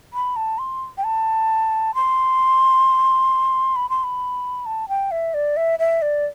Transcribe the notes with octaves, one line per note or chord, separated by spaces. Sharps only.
B5
A5
C6
G5
A5
C6
B5
C6
B5
A5
G5
E5
D5
E5
E5
D5